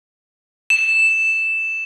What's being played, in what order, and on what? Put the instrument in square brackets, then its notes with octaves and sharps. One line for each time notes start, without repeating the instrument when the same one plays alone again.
[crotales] E7